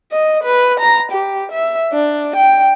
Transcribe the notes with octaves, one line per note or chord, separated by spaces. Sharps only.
D#5
B4
A#5
G4
E5
D4
G5